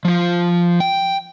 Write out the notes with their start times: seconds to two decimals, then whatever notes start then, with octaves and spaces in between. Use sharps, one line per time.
0.05 F3 F4
0.80 G5